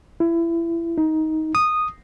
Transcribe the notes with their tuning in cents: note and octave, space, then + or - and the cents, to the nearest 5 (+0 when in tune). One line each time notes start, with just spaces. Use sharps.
E4 +25
D#4 +15
D#6 -10